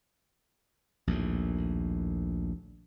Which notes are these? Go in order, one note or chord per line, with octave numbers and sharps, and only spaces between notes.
A#1 D#2 A2